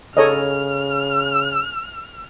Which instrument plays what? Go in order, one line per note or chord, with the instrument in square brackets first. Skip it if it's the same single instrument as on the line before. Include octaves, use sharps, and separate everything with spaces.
[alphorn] C#3 [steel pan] A4 C#5 D#5 [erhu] F6